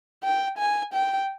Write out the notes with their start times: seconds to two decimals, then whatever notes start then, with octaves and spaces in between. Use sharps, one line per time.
0.24 G5
0.58 G#5
0.94 G5